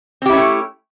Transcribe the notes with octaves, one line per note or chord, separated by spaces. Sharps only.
A3 C4 C#4 E4 G4